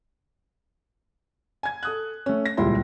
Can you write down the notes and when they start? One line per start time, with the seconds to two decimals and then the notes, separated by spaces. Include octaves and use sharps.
1.63 G#5 G#6
1.83 A4 D#6 F#6
2.26 A3 C#4
2.46 A#6
2.57 D#1 C#2 A#2 G3 E4 C6